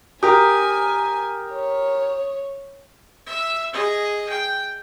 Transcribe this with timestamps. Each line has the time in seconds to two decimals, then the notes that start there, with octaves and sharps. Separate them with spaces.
0.23 G4 A#4 G#5 D#6
1.53 C#5
3.26 E5
3.73 G#4 D#5
4.29 G5